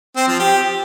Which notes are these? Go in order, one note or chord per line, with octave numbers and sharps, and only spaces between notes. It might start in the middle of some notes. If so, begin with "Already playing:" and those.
C4
F3
G4